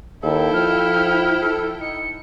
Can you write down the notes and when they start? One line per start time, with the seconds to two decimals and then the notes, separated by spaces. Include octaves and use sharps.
0.23 D#2 E4 A4 G5
0.53 F3 F6
1.41 A4
1.81 D#4 C#7